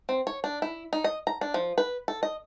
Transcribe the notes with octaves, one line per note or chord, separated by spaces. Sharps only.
C4
C#5
D4
E4
D#4
D#5
A#5
D4
F3
B4
A4
D#5